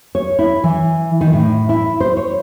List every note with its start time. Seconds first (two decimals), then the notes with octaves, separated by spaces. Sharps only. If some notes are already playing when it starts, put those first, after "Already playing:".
0.15 C#5
0.39 E4
0.64 E3
1.21 D#3
1.33 A2
1.69 E4
2.00 C5
2.17 C#5